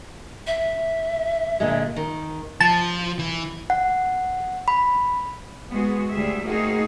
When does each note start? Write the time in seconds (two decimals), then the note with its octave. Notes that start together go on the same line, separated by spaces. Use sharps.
0.47 E5
1.60 A#2 D3 G#3
1.96 D#3
2.61 F3 A5
3.19 E3
3.70 F#5
4.68 B5
5.69 G#3 B3 F#4 G#4
6.11 D2 G3 G#4 E5
6.43 A3 A#3 C4 D#4 F#4 G#4